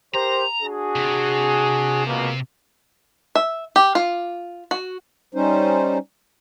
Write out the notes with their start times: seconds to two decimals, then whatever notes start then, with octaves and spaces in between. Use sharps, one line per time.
0.14 G4 A#4 C5 A#5
0.63 D4 F#4 G#4
0.96 C3
2.07 C#2 B2 A#3
3.35 E5
3.76 G4
3.95 F4
4.71 F#4
5.35 G3 C#4 D#4 C5